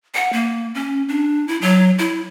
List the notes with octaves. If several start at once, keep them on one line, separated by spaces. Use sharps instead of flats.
F#5
A#3
C#4
D4
E4
F#3
E4